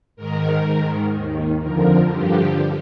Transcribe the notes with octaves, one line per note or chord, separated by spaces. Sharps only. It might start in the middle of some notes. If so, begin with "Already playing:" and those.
G#2 D#3 A#4
G#2 D#3
D#2 D#3
F2 D3 F3 A#4
G2 D3 F3 G4